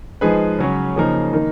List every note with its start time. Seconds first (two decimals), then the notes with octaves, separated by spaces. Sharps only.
0.21 F3 G#3 D#4 G#4 B4
0.59 C#3 F#3 C#4
0.96 C#3 F3 A#3 D#4 A#4
1.33 D#3 A#3 D#4 A#4